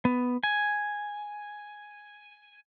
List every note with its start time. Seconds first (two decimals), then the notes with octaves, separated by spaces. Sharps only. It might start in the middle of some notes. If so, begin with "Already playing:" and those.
0.05 B3
0.43 G#5